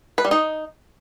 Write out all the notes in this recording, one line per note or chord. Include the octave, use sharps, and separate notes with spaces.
B4
G3
D#4